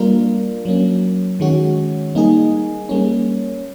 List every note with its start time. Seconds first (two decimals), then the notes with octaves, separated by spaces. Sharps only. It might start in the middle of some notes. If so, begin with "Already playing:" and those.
Already playing: G3 A#3 D4 F4 A#4
0.65 F#3 A#3 C#4
1.40 D#3 G#3 C#4 F#4
2.15 G3 A#3 D#4 G#4
2.89 G3 A#3 C#4